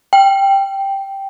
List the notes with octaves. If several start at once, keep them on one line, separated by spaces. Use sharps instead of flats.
G5